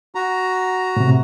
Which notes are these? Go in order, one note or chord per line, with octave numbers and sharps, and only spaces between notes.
F#4 A#5
A2 C3